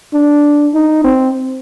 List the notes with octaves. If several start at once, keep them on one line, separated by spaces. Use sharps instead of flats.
D4
D#4
C4